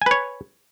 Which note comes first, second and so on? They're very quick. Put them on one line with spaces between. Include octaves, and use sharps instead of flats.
G#5 B4 C#5